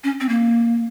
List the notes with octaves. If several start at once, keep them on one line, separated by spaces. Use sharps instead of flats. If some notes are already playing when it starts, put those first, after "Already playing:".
C#4
C4
A#3